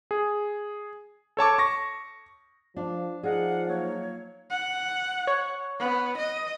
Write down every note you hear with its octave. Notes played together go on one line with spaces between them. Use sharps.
G#4
A4 C#5 A5 D6
C#6 A#6
F3 D4 F5
F3 D#4 G#4 D5 F5 F#5
F#3 A#3 C#5
F#5
C#5
B3
D#5